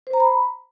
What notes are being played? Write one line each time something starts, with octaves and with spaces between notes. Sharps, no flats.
C5
A#5
B5